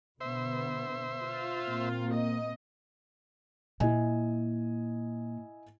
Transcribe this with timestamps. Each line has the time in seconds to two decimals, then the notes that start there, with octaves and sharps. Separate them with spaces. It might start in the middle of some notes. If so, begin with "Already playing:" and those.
0.20 B2 D3 B3 C5 E5
1.22 F4
1.62 A#2 A#3 C4
2.14 D#5
3.80 A#2 E4 D#5 G#5